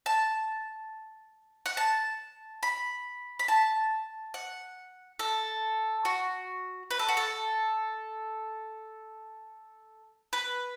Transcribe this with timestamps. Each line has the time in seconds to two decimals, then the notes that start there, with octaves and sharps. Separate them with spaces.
0.06 A5
1.66 F#5
1.77 A5
2.63 B5
3.39 B5
3.48 A5
4.34 F#5
5.19 A4
6.05 F#4
6.91 B4
6.99 A4
7.09 F#4
7.17 A4
10.33 B4